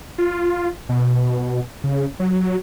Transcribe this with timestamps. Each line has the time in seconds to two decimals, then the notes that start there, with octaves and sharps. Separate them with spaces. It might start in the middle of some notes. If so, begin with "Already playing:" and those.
0.18 F4
0.89 B2
1.84 C#3
2.20 F#3